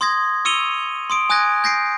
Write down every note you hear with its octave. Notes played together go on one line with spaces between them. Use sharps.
C6 D#6 G#6 A#6
C#6 E6 C#7 D#7 F7 G7
C6 D#6 D7
G#5 D#6 F#6 G#6 A#6
G6 A#6 C7 D7